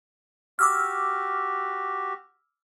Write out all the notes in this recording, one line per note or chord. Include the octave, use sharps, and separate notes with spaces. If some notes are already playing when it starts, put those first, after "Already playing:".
F#4 G4 D6 E6 F6